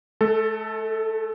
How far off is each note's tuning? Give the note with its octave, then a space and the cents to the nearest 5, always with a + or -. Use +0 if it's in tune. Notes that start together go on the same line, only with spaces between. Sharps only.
A3 -40 A4 +10